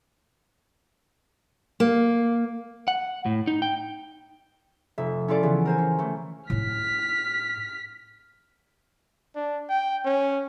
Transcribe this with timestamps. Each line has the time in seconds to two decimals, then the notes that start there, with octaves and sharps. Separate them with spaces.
1.80 A#3
2.88 F#5
3.26 A2
3.47 D#4
3.62 G5
4.98 F1 E5
5.28 C#4 E4 F4 A4 D5
5.43 C#3 E3 B3
5.65 A#4 C5 G#5
5.78 C#4
5.98 E3 A3
6.50 A2 D#4 F6 B6
9.36 D4
9.69 G5
10.05 C#4